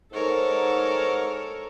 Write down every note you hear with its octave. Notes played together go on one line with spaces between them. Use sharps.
G#2 A4 A#4 C#5